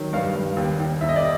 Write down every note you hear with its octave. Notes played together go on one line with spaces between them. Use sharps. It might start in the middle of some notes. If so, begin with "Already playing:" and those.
Already playing: D#3 F#3
G2 F5
G2
D#2
D#2
D#2 E5
D#5
D5